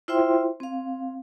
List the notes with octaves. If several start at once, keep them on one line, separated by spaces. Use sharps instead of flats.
E4 F4 C5 E5 G5 C6
C4 F5